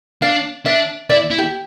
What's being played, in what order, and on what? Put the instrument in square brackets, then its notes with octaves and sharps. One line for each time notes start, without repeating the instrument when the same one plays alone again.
[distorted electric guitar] D4 [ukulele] F5
[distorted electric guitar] D4 [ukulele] E5
[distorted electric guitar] E4 [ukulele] D5
[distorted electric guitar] E4
[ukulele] G4